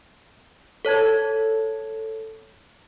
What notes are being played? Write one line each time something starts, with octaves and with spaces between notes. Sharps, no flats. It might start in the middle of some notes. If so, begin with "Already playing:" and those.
A4 C#5 A5 G#6